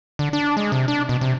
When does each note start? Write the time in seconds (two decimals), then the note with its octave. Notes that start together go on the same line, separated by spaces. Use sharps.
0.19 D3
0.33 D4
0.57 G#3
0.72 C3
0.88 D4
1.09 B2
1.21 C3